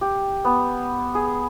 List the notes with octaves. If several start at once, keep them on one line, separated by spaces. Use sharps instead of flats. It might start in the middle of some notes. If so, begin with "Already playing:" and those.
G4
B3
G#4